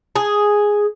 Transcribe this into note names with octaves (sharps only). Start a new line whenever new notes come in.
G#4